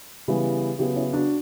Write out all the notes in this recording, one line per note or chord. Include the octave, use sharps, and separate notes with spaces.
C#3 E3 G3 B3
C#3 F#3 B3 E4 G4
C#4 E4
D4 F#4